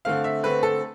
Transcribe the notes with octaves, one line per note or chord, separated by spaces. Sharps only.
D3 A3 C4 F5
E5
D3 A3 C4 B4
A4